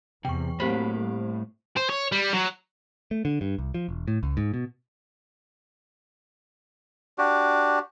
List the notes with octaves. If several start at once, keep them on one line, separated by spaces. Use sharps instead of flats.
E2 C3 G5 C#6
A2 F#3 A3 A#3 C4 G4 C5 B5
G3
C5
C#5
G3
F#3
A3
D3
G2
C2
F3
E1
A2
C#2
G#2
B2
D4 F#4 G4